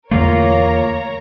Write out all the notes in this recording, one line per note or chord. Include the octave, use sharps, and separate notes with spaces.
E2 D3 A3 A#3 F4 A#4 C#5 A#5